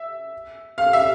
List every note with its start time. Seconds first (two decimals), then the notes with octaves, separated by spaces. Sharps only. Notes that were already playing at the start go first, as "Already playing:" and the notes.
Already playing: E5
0.78 F5
0.93 E5